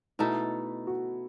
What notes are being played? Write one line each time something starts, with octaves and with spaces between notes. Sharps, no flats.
B2 A3 D#4 E4 A4
F#4